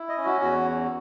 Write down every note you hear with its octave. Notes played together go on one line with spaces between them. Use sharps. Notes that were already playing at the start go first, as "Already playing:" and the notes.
Already playing: E4
D#5
C#4
F#4
E2 F#4